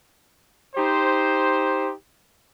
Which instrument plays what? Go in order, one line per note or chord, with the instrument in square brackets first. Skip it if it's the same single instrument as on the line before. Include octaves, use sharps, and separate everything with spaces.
[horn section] D#4 G4 C5